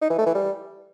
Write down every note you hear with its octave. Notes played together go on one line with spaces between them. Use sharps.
D#4
E3
A3
E3
G3